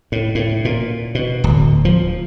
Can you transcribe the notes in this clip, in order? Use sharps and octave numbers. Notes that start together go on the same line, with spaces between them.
A2
A2
A#2
B2
D1
F3